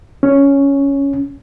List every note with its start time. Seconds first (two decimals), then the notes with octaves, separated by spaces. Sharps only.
0.23 C#4